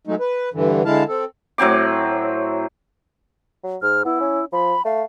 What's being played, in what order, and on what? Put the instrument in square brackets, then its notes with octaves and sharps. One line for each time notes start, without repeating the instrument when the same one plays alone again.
[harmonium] F#3 G#3 A3 D#4
B4
G2 D3 E3
D3 G#3 E4 F5 A5
C4 A4
[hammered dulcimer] A2 F#3 C4 D6
[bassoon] F#3
[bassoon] G#2 [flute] F6
[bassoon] B3 [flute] E4
[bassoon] C#4
[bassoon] F3 [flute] B5
[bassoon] A3 [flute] F5